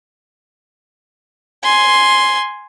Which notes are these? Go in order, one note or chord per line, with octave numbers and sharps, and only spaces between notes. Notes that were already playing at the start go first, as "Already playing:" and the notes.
G#5 C6